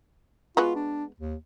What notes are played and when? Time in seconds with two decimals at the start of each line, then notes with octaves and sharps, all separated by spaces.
0.57 G#3 B3 F4 F#4
0.76 D4
1.20 D#2